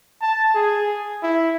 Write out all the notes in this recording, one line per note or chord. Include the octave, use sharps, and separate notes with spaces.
A5
G#4
E4